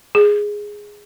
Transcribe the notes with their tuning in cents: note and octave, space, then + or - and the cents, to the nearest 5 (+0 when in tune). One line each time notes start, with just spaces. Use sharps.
G#4 -5